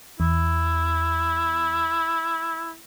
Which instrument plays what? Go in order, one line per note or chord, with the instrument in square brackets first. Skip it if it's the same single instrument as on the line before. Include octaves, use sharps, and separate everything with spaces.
[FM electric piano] E2 [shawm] E4